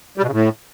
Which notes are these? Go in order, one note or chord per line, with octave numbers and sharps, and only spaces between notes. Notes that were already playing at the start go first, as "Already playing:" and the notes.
G3
B2
C#3
A2